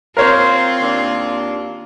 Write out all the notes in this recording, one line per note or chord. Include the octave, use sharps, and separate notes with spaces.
A#3 C4 F4 A#4 C5 C#5
D#2 A#3 D4